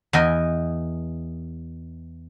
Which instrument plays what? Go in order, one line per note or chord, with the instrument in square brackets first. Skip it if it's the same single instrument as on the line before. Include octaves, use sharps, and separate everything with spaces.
[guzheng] E2 D#5 G5 G#5